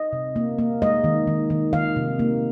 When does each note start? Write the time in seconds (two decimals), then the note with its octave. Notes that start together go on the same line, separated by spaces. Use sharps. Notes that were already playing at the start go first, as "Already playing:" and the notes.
Already playing: D#5
0.13 C3
0.36 A#3
0.58 A#3
0.82 G#3 D#5
1.04 D#3
1.27 D#3
1.50 D#3
1.73 D#3 F5
1.96 C3
2.19 A#3